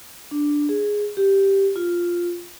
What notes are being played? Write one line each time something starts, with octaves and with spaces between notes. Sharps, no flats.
D4
G#4
G4
F4